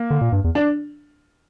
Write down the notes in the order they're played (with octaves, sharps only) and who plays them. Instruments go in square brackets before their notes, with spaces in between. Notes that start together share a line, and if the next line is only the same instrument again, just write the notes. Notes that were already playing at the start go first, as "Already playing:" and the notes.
Already playing: [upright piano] A#3
[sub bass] D3
A#2
G2
E2
[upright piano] D4